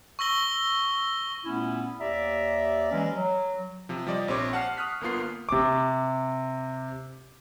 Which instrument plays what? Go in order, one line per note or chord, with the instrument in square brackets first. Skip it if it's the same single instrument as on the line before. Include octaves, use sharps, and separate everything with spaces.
[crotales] C#6 E6 A#6 G7
[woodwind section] A#2 A3 B3 C#4 E4
D#2 G4 D5 E5 A#5
E3 F#3 G#3 C#4
F#3
[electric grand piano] C3 F3
F3 G3 D5 D#5
A#1 C4 G4 C#5 D6 A#6
F#5 A5 F6 C7
C#6 D#6 F6 F#6 B6
G1 A#3 B3 F4 C7
[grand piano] C3 D6